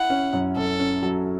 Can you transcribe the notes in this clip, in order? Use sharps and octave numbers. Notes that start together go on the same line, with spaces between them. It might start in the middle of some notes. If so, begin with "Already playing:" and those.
Already playing: E4 F#5
C#4
F#2
F#2 A4
C#4
F#3